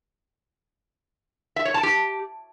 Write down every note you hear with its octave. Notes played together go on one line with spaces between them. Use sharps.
E5
C#5
A5
G4